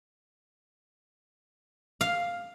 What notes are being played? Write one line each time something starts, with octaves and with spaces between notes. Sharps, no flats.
F5